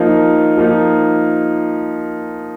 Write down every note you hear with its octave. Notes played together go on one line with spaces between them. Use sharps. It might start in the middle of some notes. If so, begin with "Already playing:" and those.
Already playing: F3 A#3 D#4
F3 A#3 D#4